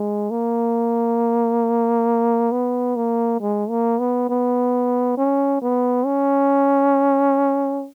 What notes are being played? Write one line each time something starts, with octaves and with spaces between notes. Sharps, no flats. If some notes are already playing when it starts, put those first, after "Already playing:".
Already playing: G#3
A#3
B3
A#3
G#3
A#3
B3
B3
C#4
B3
C#4